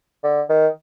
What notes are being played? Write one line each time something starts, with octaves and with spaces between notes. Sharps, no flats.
D3
D#3